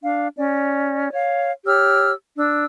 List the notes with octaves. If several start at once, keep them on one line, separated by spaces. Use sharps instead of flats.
D4 F5
C#4 D5
C#5 F5
G4 C#5 E6 F6
D4 E6